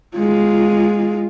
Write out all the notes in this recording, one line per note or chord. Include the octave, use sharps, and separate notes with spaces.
G#3 F4